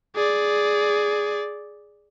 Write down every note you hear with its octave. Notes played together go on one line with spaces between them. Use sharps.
G#4 D5